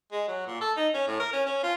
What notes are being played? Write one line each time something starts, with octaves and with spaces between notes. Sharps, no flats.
G#3
F#3
A#2
A4
D#4
C#4
A2
A#4
C#4
C#4
F4